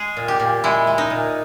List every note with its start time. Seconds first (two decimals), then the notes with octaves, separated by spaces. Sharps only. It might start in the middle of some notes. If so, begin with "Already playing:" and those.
Already playing: G#3 G#4
0.17 A#2
0.28 G4
0.40 A#2
0.64 G#3 E4
0.87 G#3
0.98 D#4
1.10 A#2